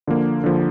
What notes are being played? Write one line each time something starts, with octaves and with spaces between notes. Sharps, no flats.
D3 F3 A#3
D3 F3 A#3